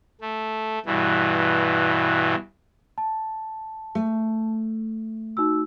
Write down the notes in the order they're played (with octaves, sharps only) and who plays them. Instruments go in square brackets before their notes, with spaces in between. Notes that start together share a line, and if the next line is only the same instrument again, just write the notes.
[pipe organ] A3
G2 B2 E3
[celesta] A5
[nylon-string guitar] A3
[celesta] D#4 F#4 E6